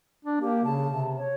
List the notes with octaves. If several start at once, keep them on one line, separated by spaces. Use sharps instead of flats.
D4
A#3 G4
C#3 A5
C3
C#5